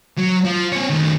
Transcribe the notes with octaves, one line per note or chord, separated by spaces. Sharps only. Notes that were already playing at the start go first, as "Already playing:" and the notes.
F#3
F3
C4 C#5
D#3 A3